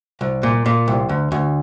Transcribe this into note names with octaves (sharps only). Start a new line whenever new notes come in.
C2
A#2
A#2
C2
D2
D2